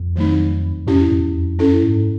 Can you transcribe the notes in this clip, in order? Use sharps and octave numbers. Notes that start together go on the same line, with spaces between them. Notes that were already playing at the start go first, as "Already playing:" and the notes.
Already playing: F2
D#3 F#3 A3 C4 D#4
F2 C#4 E4 G4
E2
F2
F#2 C#4 E4 A4
G#2